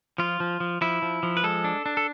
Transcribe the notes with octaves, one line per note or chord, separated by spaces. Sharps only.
F3 F4
F3
F3
F3 E4
F3
F3
B4
G#3 A4
D4
D4
A4